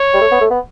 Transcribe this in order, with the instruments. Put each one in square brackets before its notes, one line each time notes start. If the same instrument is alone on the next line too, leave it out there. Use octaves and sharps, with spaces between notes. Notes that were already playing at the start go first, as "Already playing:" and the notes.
Already playing: [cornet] C#5
[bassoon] G3
A3
B3
A3
B3